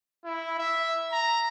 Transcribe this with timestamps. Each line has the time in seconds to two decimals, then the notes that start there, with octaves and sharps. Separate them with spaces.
0.25 E4
0.58 E5
1.12 A#5